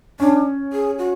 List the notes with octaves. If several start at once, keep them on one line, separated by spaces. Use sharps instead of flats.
C#4 D4
G#4
F#4